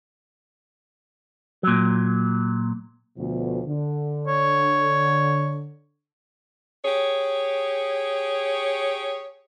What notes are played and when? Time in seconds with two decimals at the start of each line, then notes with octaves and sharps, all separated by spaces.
1.63 A#2 F#3
3.17 D2 B2 F3
3.67 D3
4.27 C#5
6.85 G4 G#4 C#5